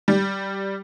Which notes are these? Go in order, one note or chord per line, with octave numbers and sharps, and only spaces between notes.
G3